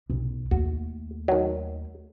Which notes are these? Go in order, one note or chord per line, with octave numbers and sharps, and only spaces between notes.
B1 E2
D#2 A3 F#4
D#3 F#3